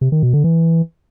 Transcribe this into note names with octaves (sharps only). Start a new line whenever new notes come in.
C3
D#3
B2
D3
E3